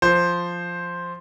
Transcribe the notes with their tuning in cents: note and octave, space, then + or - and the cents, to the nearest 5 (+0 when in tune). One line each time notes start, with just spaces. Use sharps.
F3 +0 C5 +0